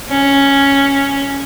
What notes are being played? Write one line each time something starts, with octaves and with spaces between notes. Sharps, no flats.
C#4